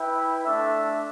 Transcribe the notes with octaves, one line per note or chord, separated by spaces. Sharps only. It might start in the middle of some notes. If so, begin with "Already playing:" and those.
Already playing: E4 B4 E5 G5
A3 D4 A4 E5